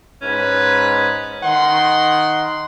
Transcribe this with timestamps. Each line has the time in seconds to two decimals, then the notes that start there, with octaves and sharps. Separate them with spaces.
0.22 G#2 C#4 B4
1.43 D#3 F#5 C6